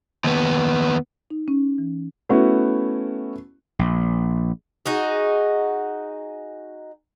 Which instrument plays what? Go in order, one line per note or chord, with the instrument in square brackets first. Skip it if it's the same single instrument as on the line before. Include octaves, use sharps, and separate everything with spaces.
[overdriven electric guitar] D#2 B3
[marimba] D#4
C#4
E3
[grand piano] A3 B3 C#4 E4 F#4
[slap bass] A#1
[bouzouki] D#4 F#4 G#4